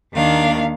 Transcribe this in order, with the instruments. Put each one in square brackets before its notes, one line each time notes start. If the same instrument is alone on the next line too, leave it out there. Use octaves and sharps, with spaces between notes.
[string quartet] D#2 D#3 A#3 D4 F5